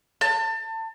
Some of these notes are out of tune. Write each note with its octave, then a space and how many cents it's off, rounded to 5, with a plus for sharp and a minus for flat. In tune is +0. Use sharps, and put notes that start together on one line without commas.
A5 +30